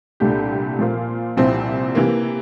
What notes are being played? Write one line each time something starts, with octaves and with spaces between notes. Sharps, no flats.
C2 A#2 A3 D4 G4
A#2 F3 A#3 F4
C2 A#2 F3 C4 E4
C3 E3 A#3